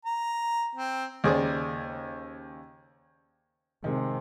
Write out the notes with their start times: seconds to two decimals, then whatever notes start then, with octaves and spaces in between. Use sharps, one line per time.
0.05 A#5
0.75 C4
1.24 D#2 C#3 G#4 C5 D5 D6
3.84 C3 D#3 G#3